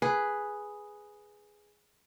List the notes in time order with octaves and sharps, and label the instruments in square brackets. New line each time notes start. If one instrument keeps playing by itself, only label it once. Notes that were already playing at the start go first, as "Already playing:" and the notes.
[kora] G#4 B4